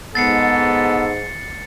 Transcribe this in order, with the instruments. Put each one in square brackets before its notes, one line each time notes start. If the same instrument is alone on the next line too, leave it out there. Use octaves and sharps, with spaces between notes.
[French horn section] G#2 [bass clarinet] B3 [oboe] A4 [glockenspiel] A6 C7 C#7